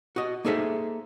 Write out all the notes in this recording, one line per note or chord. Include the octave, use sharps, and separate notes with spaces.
F#4 D#5
A#3 D#4 G#4 A4 C5 E5